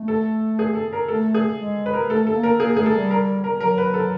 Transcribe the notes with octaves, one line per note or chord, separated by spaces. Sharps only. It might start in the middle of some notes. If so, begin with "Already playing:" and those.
Already playing: A3
A4
G#4
A4
A#4
A3 A4
G#4
G#3
B4
A#4
A3 A4
A4
A#3
A#4
A#3 G#4
A3 G#4
A4
G3
A#4
A#4
F#3 A#4
B4
A4